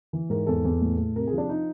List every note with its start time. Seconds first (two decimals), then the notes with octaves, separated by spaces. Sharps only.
0.13 E3
0.30 G#2 A#4
0.47 E2 A4
0.65 E2
0.81 A2
0.98 A2
1.16 C3 A#4
1.27 G#4
1.33 F3 D4
1.49 D#4